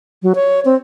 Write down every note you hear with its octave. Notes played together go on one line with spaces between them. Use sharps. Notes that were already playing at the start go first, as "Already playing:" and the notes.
F#3
C#5
C4